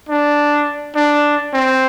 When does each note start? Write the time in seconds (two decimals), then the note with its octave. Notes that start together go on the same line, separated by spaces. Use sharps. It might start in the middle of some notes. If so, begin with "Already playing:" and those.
0.09 D4
0.96 D4
1.54 C4